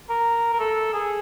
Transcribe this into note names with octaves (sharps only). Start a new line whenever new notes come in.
A#4
A#4
A4
G#4